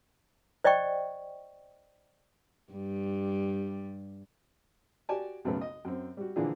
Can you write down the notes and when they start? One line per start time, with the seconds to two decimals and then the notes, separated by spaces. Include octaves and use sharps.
0.64 C5 D5 D#5 G5 C#6
2.73 G2 G3
5.09 F#4 G4 D5 G#5 A5
5.45 B1 F#2 C#3 A3 B4
5.61 D#5
5.85 F#2 C4
6.17 G3 F#4
6.36 A#2 D3 E3 F3 D4 G#4